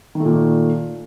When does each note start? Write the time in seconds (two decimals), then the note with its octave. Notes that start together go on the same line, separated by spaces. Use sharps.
0.15 D#3
0.20 A3
0.25 A#2